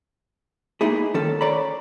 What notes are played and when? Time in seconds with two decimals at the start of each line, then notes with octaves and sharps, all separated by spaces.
0.81 A#3 D#4 E4 G#4
1.14 D#3 C#4 A4
1.41 C#5 D5 A#5 B5